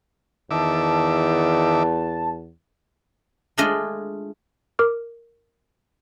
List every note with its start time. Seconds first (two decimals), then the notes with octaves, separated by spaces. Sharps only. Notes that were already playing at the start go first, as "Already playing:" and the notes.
0.51 E2 D#3 E5 A5 D6
3.58 G#3 A3 D4 F4 D#5
4.79 A#4 D6 F6